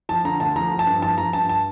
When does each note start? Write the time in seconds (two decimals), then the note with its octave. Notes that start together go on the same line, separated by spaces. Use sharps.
0.09 F3 A5
0.25 D3 A#5
0.40 D2 A5
0.56 F3 A#5
0.71 F3
0.79 A5
0.87 G2
1.02 F3 A5
1.18 F3 A#5
1.33 G2 A5
1.49 A5